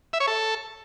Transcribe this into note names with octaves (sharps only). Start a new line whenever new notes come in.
E5
C#5
A4